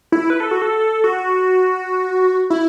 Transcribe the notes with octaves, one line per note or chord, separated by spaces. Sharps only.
E4
B4
A4
F#4
A4
F#4
E4